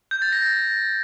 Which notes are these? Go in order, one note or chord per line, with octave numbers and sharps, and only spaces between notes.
G6
A6
A#6